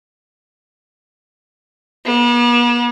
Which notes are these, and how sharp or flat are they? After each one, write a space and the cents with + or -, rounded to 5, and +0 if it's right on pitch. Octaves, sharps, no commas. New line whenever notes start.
B3 -45